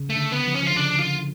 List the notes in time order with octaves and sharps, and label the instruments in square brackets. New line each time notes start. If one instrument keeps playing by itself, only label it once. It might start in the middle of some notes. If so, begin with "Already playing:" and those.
Already playing: [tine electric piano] C#3
[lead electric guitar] A3
[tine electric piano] D3
[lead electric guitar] B3
[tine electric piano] F3
[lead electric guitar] C#4
[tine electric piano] F3
[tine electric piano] D3 [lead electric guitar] F4
[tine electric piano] C#3 [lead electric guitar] D4
[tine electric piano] D3 [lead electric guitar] F4